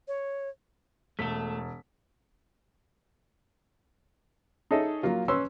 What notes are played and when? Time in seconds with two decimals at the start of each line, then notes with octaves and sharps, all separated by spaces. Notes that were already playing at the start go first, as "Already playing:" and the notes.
0.08 C#5
1.19 E1 A3 A4 B6
4.71 D#4 G#4 A4 C#5 D#5 E5
5.03 F#3 A#3 F4
5.28 C#4 B4 C6 E6